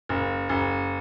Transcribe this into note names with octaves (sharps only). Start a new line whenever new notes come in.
F#1
F#1